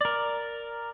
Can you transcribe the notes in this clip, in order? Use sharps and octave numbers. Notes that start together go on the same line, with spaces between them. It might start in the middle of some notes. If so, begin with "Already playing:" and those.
A#4 D5